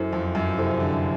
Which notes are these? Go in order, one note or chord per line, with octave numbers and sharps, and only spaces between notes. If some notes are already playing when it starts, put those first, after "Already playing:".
Already playing: F#2 E4 A4 C5
F2
F#2
C3 E4 A4 C5
D3
D3